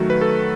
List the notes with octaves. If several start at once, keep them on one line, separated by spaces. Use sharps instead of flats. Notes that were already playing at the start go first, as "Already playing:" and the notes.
Already playing: D#3 F#3 A3 F#4
B4
A4